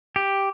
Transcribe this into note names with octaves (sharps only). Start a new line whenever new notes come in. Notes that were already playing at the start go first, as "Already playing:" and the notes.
G4